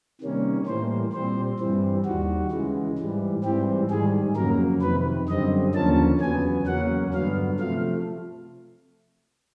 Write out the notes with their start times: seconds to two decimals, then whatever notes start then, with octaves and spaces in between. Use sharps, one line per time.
0.21 C3 D#3 G3 A#3 C#4
0.66 A2 E3 G3 A#3 C5
1.13 A#2 G3 C4 C5
1.59 G2 E3 G3 C4
2.05 D#2 D#3 G3 F#4
2.51 C#3 E3 G#3
2.98 G#2 E3 G3
3.44 G#2 E3 G3 C4 G4
3.90 G#2 D#3 G3 G#4
4.36 F2 C#3 F#3 A#3 A#4
4.82 F2 C3 D#3 B4
5.29 F#2 D3 G3 C4 D#5
5.74 D#2 D3 F3 A#3 C#4 A5
6.21 E2 C#3 F#3 B3 G#5
6.67 E2 C#3 F#3 A#3 C#4 F#5
7.14 G2 D3 F#3 B3 F5
7.59 C3 F3 A3 F5